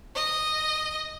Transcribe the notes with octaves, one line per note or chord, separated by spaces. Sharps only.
D#5